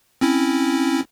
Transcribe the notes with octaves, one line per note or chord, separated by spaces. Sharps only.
C4 C#4 E4